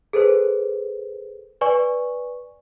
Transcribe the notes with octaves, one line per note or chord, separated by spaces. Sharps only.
G#4 A4 B4 C5
B4 D5 G#5 C#6